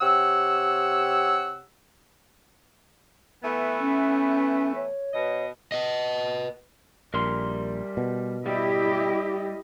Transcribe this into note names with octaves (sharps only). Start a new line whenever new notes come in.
C3 G4 C#5 F#5 E6
E3 A3 B3
C#4
C#5
B2 D#5
B4 D#5
A#1 G3 A#4 C6
B2
G3 E4 G4 D#5